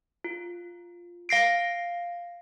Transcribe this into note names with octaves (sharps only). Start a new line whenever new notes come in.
F4
F5 A#6 C7 D7